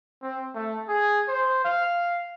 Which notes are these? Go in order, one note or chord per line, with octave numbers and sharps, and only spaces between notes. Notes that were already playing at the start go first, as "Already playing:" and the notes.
C4
A3
G#4
C5
F5